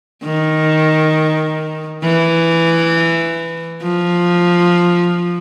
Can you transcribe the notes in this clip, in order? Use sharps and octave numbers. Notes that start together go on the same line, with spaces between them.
D#3
E3
F3